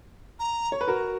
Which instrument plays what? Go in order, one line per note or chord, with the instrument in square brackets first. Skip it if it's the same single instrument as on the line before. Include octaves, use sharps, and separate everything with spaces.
[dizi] A#5
[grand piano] C#5
B4
F#4 A#4